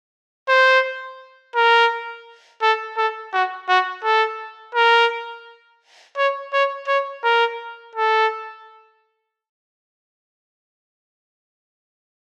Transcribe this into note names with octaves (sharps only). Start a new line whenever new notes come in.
C5
A#4
A4
A4
F#4
F#4
A4
A#4
C#5
C#5
C#5
A#4
A4